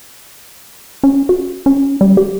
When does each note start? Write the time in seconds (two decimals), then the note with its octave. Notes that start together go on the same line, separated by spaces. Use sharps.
1.03 C#4
1.29 F#4
1.66 C#4
2.01 G3
2.17 G4